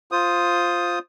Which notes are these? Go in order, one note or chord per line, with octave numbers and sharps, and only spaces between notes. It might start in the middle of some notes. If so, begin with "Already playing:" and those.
F4 C5 D#6